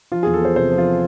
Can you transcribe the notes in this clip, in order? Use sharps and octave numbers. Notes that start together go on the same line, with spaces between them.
F3 F4
E2 G#4
A4
B3 C5
C3 C5
F3
F4